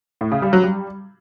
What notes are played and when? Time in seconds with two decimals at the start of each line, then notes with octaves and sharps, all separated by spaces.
0.21 A2
0.32 C#3
0.42 G3
0.53 F#3
0.63 G3